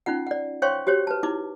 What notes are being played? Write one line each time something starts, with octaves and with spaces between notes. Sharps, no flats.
C#4 D#4 F4 F#5
D5 F#5
C5 C#5 F5 G5 C6 C#6
F#4 G4 C5 C#5
B4 A5
D#4 E4 D6